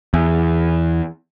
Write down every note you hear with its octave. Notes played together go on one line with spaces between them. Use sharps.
E2